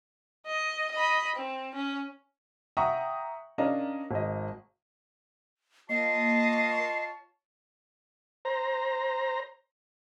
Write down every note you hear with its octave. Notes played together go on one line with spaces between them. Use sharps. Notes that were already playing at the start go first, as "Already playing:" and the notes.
D#5
D#5 B5
C4
C#4
E5 F#5 G5 A#5 C#6 D#6
C#4 D4 A#4 D#5 F5
G#1 D#5
A#3 F4 C#5 D#5 A5 C7
C5 A#5